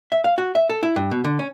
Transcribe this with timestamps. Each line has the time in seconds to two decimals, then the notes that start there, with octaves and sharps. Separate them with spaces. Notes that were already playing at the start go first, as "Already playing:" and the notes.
0.12 E5
0.24 F5
0.38 F#4
0.55 E5
0.69 A4
0.83 E4
0.96 G2
1.11 B2
1.24 D3
1.39 C#4